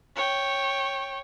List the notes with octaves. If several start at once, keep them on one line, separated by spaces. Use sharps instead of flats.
C#5 G5